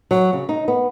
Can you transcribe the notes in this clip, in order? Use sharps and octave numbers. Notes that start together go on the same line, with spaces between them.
F#3
C#3
D#4
B3